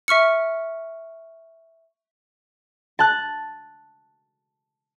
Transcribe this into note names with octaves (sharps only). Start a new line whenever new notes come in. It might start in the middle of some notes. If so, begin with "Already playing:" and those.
E5 C#6 F6 C#7
A5 F#6